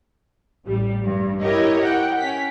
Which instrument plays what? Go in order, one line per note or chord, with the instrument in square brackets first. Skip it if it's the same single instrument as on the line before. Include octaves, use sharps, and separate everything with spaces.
[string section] A1 G3
G2
E4 G4 A#4 C#5 D#5
F#5 G5
C#4 B6